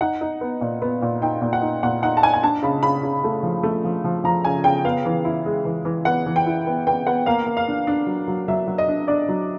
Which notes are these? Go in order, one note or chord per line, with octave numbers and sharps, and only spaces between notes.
D#4 F#5
D#4
B3
A#2
B3
A#2
D#4 G5
A#2
F#5
D#4
A#2 F#5
D#4 F#5
A5
D#4 G#5
G#5
D4 A5
C#3 B5
C#3 B5
C#3
A3
F3
A3
F3
F3
F3 A#5
C#3 G#5
C#3 G5
B3 F5
E3
E4
G#3
E3
E3
B3 F#5
E3
G5
E4
B3
B3 G5
B3 F#5
A#3 F5
A#3
F5
D4
D4
F#3
F#3
F#3 E5
F#3
D#5
D4
D4 D5
F#3